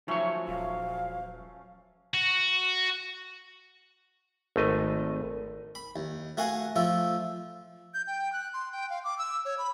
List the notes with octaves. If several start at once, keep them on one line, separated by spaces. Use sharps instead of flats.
F3 F#3 A3 C#4 D#4 C#5
D#1 F5
F#4
G#1 A3 D#5
B5
D#2
A3 F#4 A#4 F5 F#5 G#5
F3 A3 F4 E5
G6
G5
F#6
C6
G5
F5
D6
E6
C#5
B5